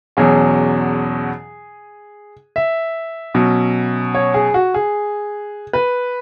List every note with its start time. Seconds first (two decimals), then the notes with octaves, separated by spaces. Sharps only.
0.17 E2 B2 F#3 C#4 G#4
2.56 E5
3.34 B2 F#3 C#4
4.15 C#5
4.34 G#4
4.54 F#4
4.74 G#4
5.73 B4